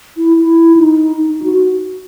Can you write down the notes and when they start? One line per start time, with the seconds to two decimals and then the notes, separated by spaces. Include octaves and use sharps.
0.17 E4
0.37 E4
0.77 D#4
1.16 D#4
1.43 F#4